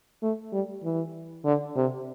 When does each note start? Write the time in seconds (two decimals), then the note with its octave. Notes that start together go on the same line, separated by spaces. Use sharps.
0.23 A3
0.53 G3
0.84 E3
1.45 D3
1.76 C3